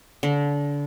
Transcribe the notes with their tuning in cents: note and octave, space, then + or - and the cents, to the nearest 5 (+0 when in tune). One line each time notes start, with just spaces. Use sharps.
D3 -30